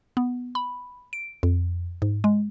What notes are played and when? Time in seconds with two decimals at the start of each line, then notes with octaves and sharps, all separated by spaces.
0.17 B3
0.55 B5
1.13 D7
1.43 F2
2.02 G#2
2.24 G#3